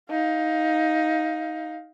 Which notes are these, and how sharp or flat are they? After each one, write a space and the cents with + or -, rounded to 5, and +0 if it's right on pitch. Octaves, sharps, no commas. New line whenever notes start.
D#4 +15 F5 +15